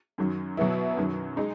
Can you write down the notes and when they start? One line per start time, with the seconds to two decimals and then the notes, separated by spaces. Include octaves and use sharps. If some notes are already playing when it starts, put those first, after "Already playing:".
0.18 F#2 D#3 F#3
0.57 B2 F#3 B3 E4
0.97 F#2 D#3 F#3
1.37 G#3 D#4